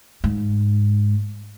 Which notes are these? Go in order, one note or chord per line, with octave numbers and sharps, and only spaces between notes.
G#2